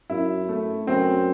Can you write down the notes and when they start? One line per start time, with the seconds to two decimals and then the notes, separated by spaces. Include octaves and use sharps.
0.10 F#2 E4
0.49 A3
0.87 F#2 C4